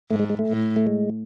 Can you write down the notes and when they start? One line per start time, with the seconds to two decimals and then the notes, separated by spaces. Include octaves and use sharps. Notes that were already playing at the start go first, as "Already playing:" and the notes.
0.11 G#2 A3
0.19 G#3
0.30 G#3
0.39 A3
0.48 A2
0.76 A3
0.87 G#3